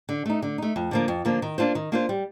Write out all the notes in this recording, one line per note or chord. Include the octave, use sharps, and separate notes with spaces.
D3
A3 D#4
D3
A3 D#4
F2
D3 F3 A#3
F2
D3 F3 A#3
D#3
A#3 D4 F4 C5
D#3
A#3 D4 F4 C5
G3